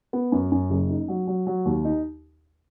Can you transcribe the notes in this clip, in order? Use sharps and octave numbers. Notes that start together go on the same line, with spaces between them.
B3
F#2
F#2
F#1
D#4
F#3
F#3
F#3
D#2
D#4